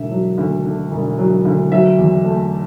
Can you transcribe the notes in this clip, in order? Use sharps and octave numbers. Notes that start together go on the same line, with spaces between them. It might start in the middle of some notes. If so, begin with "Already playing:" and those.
Already playing: E1 D3 E5
F#3
D2
D3
E1
F#3
D2
F#3 E5
E2
A3